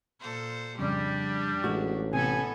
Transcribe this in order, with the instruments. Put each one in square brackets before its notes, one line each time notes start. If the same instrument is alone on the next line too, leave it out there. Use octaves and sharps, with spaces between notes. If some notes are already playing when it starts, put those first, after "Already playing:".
[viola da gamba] A#2 A4 C5
[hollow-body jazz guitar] F2 C#3 [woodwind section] G3 [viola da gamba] D4 G4
[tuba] A1 [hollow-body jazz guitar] G#3 F#4
[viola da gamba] A2 B3 A4 [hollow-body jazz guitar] C3 [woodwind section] G#5